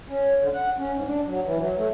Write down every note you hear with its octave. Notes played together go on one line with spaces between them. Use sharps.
C#4
D3
F#5
C#4
G#2
D4
F#3
E3
F#3
A3